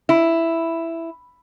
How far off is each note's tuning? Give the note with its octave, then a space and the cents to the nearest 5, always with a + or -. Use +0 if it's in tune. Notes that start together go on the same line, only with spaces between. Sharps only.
E4 +5